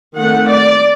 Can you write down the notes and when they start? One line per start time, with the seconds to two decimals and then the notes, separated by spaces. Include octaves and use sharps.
0.17 D#3 A3 C4 F#5
0.49 D5